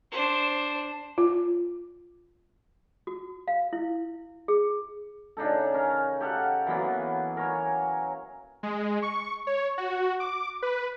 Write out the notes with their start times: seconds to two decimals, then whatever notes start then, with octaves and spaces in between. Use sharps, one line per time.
0.11 D4 C5
1.18 F4
3.07 F#4
3.48 F5
3.73 E4
4.48 G#4
5.37 C#3 D4 D#4 A4
5.74 C#4 A#4 A#5
6.20 G4 A4 F5 F#5
6.66 E3 F#3 A#3 B3
7.37 A#4 C#5 G#5
8.63 G#3
9.02 C#6
9.47 C#5
9.78 F#4
10.20 D6
10.62 B4